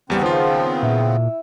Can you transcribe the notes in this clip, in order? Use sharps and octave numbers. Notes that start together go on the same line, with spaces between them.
E2 C#3 G3 B3 C4
D#3 F3 F4
A#2 E4